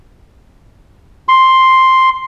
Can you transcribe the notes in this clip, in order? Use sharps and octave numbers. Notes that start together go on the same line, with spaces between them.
C6